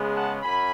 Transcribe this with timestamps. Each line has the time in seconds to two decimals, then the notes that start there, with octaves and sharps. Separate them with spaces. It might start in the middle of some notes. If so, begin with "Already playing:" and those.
Already playing: C#3 G#3 B3
0.14 F#5 A5
0.42 F#2 G#5 B5